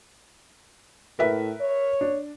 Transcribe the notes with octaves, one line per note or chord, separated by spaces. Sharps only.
A2 A#4 B4 E5
C#5
D4